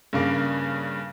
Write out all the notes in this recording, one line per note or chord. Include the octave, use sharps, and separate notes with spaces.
G2 C#3 A#3